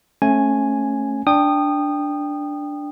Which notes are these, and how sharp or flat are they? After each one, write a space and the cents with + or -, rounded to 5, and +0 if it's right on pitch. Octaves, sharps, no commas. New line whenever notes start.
A3 +0 C#4 -20 G#5 +0
D4 +0 G5 +10 D#6 -20